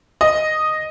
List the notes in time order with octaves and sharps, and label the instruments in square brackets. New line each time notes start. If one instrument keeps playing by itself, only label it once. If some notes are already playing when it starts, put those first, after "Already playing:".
[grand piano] D#5